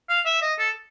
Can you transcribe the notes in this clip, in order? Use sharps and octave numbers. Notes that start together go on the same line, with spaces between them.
F5
E5
D#5
A4